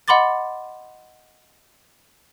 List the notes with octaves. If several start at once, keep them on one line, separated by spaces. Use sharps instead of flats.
D#5 F#5 B5 C6 D6 A6